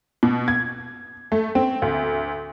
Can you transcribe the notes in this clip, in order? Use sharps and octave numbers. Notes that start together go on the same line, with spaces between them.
B2
G#6
A3
C4
D2